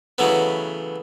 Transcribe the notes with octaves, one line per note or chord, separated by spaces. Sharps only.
C#3 E3 F#3 A3 B3